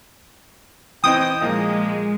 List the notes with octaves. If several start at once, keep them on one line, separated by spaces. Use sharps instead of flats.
E3 C4 D#4 G5 D#6
A#2 F3 G#3 A#3 D#5